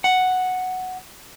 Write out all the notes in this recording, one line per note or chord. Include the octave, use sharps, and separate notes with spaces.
F#5